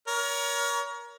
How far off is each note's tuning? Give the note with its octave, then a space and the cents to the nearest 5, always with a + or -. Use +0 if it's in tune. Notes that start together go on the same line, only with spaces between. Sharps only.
A#4 +25 C#5 +30